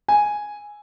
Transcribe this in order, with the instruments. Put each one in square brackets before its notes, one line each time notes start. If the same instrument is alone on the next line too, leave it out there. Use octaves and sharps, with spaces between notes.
[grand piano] G#5